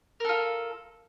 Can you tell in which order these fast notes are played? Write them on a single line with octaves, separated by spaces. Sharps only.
A#4 A4 F4